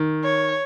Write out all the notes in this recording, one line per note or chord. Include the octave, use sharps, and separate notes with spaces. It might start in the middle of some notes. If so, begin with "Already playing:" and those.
Already playing: D#3
C#5